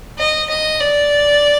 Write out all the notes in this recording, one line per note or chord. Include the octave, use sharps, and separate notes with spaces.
D#5
D#5
D5